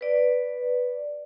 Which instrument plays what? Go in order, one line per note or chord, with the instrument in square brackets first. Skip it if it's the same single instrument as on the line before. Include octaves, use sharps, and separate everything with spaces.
[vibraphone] B4 D5